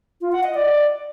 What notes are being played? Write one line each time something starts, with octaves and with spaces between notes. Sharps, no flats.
F4
F#5
D#5
D5